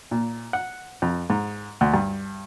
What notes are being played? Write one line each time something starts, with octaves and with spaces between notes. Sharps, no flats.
A#2
F#5
F2
G#2
D2
G2